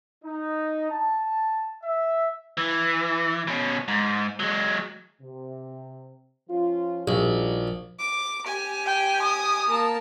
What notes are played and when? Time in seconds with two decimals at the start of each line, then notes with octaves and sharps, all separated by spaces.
0.23 D#4
0.90 A5
1.83 E5
2.57 E3
3.48 B2 C#4
3.88 G#2
4.40 F#3 G#3
5.22 C3
6.50 F3 C#4 F4
7.08 A#1 G3 D#4 F#4
7.99 D6
8.45 G4 G#5
8.86 G5
9.23 D#6
9.68 A#3 A5